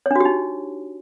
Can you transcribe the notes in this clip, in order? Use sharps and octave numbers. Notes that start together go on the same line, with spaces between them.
D4 D#4 F#4 G4 C#5